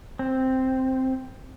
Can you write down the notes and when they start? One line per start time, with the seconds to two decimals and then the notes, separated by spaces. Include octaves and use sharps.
0.19 C4